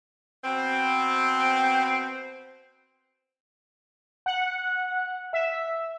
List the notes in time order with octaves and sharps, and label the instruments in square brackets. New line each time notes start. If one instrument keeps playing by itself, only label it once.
[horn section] B2 C4
[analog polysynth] F#5
E5